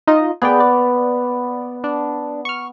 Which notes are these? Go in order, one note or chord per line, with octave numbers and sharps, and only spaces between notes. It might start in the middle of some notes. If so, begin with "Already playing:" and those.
D#4 F4 D#5
B3 G#4 D5 G5
D5
D4
C#6 F6